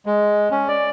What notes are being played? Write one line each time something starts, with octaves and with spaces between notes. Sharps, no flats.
G#3
C#4
D5